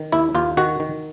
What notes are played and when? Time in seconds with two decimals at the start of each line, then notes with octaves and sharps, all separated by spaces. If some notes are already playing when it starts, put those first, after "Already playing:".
Already playing: D#3
0.12 D#2 E4
0.35 D#2 F4
0.57 D#3 F#4
0.80 D#3